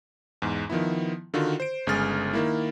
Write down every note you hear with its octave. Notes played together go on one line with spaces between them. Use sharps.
E2 G#2
D#3 F3 B3 E4
D3 D#3 F4 F#4
C5 D7
G1 C#3 G#3 G#4 F6 A6
D#3 A#3 E4